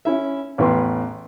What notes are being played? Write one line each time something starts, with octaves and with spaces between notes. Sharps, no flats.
C#4 E4 E5
A1 E2 B4 G5 C6